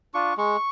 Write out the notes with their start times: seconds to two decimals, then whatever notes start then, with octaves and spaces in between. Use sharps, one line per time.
0.14 D4 F4 C#6
0.37 G#3 C#6